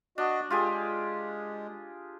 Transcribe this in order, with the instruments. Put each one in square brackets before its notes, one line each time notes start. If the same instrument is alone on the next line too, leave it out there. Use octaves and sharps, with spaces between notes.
[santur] D4 [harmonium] F#4 D#5
[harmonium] G#3 [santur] F4 G4 G#4